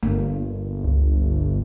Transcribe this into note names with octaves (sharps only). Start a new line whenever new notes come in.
G1 A#3
C#2